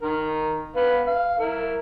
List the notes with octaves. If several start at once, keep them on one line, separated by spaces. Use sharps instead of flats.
D#3 A#4
B3 B4 F5
F5
E4 A#4